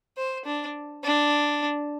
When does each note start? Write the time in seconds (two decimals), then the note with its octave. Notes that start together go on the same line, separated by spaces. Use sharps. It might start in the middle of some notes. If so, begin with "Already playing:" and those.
0.17 C5
0.45 D4
1.04 D4